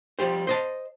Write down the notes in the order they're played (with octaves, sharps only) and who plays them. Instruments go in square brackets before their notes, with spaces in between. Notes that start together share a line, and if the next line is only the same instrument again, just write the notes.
[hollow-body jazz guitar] F3 G3 G4 C5
C5 D#5 A5